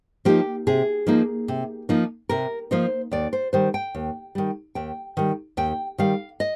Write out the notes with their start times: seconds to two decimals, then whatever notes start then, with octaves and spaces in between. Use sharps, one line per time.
0.25 F3 A#3 D#4 G4
0.67 C3 G#4
1.07 F3 A#3 D#4
1.48 C3
1.89 F3 A#3 D#4
2.29 C3 A#4
2.71 F3 A#3 D#4 C5
3.11 D#2 D5
3.33 C5
3.53 D#3 G3 C5
3.74 G5
3.95 D#2
4.35 D#3 G3
4.75 D#2 G5
5.17 D#3 G3
5.57 D#2 G5
5.98 D#3 G3 F5
6.40 D#5